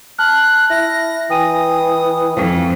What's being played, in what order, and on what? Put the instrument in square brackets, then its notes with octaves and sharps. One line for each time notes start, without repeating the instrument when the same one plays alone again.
[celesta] A5 F6 [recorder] F#6
[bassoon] E4 [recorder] A#6
[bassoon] E3 [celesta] G5 G#5 D#7 [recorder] D#6
[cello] F2 [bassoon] F3